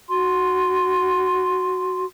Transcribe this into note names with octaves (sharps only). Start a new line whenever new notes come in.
F#4 C6